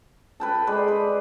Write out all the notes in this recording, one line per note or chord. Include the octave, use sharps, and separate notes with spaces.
A4 B4 G5 A5
G#3 B4 D5 C6
B4